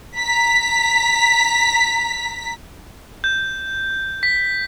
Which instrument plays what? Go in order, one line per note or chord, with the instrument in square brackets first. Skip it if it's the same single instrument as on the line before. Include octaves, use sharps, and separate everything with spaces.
[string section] A#5 B6
[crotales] G6
B6